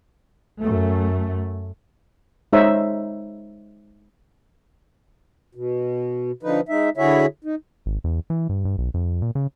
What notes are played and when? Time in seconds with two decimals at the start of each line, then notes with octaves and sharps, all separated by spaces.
0.60 F#2 A3
2.53 G#3 D#4 C5 C#5 E5 A#5
5.55 B2
6.43 D3 F3 D#4 B4
6.69 G#3 D#4 E5
6.97 D3 E4 F#4 G#4 C#5 E5
7.44 D#4
7.86 G#1
8.04 E2
8.30 E3
8.49 G2
8.65 G2
8.78 B1
8.94 F2
9.22 A#2
9.35 C#3